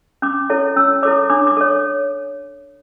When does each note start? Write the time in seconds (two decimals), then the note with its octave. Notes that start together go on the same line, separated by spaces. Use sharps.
0.22 C#4 D6
0.50 E4 A4 C#5
0.76 C#4 E6
1.03 E4 A4 C#5 D6
1.30 D4 D6
1.47 D6
1.57 A4 C#5